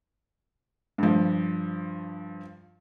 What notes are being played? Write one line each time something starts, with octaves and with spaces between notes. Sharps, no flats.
G2 F3